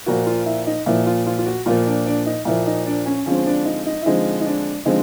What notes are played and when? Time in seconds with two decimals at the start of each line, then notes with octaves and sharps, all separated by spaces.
0.06 A#2 F3 A#3 F#4
0.26 F4
0.46 E4
0.67 D#4
0.86 A#2 F3 A#3 E4
1.06 F4
1.27 F4
1.39 F4
1.46 F#4
1.66 A#2 F3 A#3 F4
1.87 D4
2.06 D4
2.26 D#4
2.45 A#2 F3 A#3 E4
2.66 D#4
2.86 D4
3.06 C#4
3.26 D3 F3 G#3 C4 C#4
3.46 D4
3.65 D#4
3.86 D#4
4.02 E4
4.06 D3 F3 G#3 C4 D#4
4.41 D#4
4.46 D4
4.85 D3 F3 G#3 C4 D#4